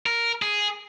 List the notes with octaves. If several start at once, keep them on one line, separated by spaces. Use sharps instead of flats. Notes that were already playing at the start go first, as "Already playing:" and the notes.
A#4
G#4